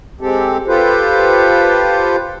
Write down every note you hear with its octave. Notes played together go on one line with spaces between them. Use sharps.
G#3 C4 G4 A4
F4 G4 A4 B4 C5